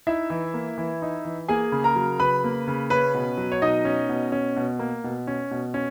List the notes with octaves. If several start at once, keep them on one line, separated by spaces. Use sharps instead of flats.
D#4 E4 E5
E3
A#3
E3
D#4
E3
A#3 G#4 G#5
C#3
A#4 A#5
F#3
C#3 B4 B5
A#3
C#3
C#4 B4 B5
B2
F#3
C#5
B2 D#4 D#5
C#4
B2
C#4
B2
A#3
B2
C#4
B2
C#4